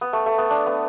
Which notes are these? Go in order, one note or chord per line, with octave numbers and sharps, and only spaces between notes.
B3
A3
A3
B3
D4
B3